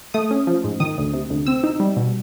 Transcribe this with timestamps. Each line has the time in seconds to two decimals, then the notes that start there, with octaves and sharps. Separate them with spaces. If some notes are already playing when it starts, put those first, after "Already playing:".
0.14 A3 D#6
0.31 C#4
0.47 F3
0.64 G#2
0.80 D#3 D#6
0.98 D2
1.13 C3
1.30 D2
1.46 C4 E6
1.64 D#4
1.80 G3
1.97 B2